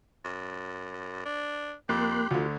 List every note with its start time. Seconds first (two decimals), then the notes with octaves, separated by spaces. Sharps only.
0.25 F#2
1.25 D4
1.89 F2 A#3 G4 C6 F#6
2.31 D2 D3 F4 F#4